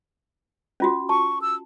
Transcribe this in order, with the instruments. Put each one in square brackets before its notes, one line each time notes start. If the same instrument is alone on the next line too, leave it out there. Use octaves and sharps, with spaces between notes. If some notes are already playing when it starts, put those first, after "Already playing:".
[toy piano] C#4 F4 F#4
[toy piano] A5 [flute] C#6
[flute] E6